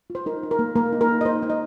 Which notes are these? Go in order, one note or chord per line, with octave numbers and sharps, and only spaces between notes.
F4
C5
D#4 A#4
D#4
A#4
A#3
A#3 A#4
D#4
A#4
D#4
D#5
D#4 C5
D#4
D#5